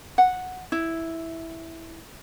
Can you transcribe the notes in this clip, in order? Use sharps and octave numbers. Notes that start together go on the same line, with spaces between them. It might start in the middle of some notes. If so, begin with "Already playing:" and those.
F#5
E4